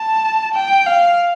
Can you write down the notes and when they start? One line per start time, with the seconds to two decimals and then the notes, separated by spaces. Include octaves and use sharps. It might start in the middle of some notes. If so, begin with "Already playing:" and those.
Already playing: A5
0.54 G5
0.86 F5